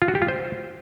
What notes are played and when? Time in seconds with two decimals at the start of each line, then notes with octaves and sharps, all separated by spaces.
0.02 F4
0.08 F#4
0.15 G4
0.22 F4
0.28 C5